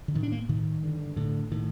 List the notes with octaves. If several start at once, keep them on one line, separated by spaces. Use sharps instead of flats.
D3
A2 D#3
D4
A#3
A2 D#3
G2 D3
A2 D3
A2 D#3